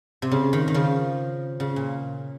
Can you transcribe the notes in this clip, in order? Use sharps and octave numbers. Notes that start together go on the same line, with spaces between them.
C3
C#3
D#3
D#3
C#3 F3
C#3
A#2